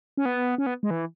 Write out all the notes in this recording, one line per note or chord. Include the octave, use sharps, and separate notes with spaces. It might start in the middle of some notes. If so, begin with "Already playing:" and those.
C#4
B3
C#4
B3
G#3
E3